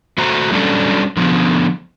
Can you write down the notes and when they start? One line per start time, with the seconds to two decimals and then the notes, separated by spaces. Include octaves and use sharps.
0.18 A3 F#4 C5 A#5
0.51 F#3 G3 C#4 D4 A4
1.17 D3 F3 B3